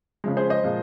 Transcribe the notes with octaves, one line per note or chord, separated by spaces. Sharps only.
C#3 F3 G#3
G#4 C5
C5 D#5
A#2 F3 G#3